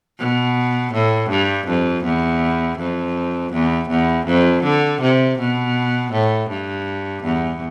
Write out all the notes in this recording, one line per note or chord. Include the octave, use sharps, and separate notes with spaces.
B2
A2
G2
F2
E2
F2
E2
E2
F2
D3
C3
B2
A2
G2
E2